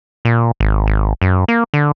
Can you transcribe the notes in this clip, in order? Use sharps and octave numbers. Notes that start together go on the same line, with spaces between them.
A#2
G#1
G#1
F#2
A#3
D3